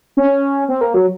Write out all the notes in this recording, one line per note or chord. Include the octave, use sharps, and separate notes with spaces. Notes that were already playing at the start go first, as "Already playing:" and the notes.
C#4
C4
A#3
F#3